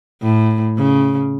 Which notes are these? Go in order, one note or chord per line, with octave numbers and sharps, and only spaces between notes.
A2
C#3